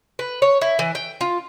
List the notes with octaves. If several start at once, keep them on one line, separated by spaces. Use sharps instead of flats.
B4
C#5
E4
E3
G5
F4